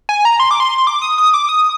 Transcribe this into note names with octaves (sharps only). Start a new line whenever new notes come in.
G#5
A#5
C6
D6
C6
C6
D6
D#6
D#6
D6
D#6